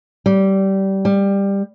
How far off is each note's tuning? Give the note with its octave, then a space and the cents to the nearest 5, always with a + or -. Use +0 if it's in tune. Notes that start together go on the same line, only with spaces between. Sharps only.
G3 -20
G3 +15